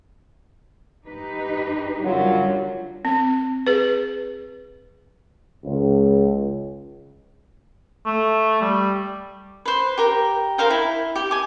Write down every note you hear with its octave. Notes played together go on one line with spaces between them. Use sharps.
D#4 G4 B4
F#2 D3 F#3 G3 F4
C4
G#4 B4
C#2
A3
G3
B4 C5
G4 A#4 G5
A#4 C5 F5 G5
E4
G4
G#5 D6